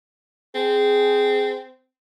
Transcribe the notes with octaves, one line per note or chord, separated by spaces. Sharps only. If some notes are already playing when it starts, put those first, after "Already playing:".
C4 G#4